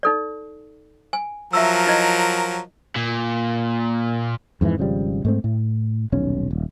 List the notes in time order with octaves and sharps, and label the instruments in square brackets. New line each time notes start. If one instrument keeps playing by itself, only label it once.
[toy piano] D#4 A4 D5
G#5
[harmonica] F3 F#3 A#4 [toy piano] E5 E6
[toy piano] E4 D#5
[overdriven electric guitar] A#2
[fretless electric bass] F2 G#2 C3 E3
G#1 C#3 F3 G3
G#2 A3 C4
A2
D#1 B1 C#4
D#1